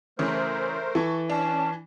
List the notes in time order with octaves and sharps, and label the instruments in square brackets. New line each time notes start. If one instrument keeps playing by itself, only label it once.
[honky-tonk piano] C#3 E3 [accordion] A3 A#4 C5
[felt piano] E3 [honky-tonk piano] A4 C#6
[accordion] C#4 [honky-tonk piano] D4 [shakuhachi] A5